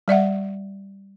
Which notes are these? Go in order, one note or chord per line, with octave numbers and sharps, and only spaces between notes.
G3 D5 E5 F#5